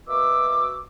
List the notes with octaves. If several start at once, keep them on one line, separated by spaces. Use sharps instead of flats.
B2 A#3 F#4 E5 D6 E6